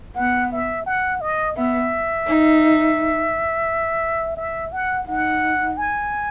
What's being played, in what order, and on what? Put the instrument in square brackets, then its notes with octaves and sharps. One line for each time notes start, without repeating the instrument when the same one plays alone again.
[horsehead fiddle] B3 [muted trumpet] F#5
[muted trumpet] E5
F#5
D#5
[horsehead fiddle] B3 [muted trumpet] E5
[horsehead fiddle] D#4
[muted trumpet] E5
F#5
[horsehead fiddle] D#4 [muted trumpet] F#5
[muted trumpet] G#5